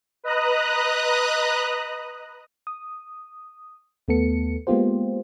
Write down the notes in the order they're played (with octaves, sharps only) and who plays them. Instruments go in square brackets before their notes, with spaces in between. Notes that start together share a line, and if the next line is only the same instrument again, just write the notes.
[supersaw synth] B4 D#5 A#5 D#6 F#6
[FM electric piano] D#6
D#2 A3 B3 A4 C#7
G#3 A#3 B3 F4 G4 C5